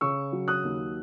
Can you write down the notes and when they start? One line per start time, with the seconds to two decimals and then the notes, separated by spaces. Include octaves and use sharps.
0.01 C#3 C#6 E6
0.33 F#3
0.48 D#6 F#6
0.64 D#2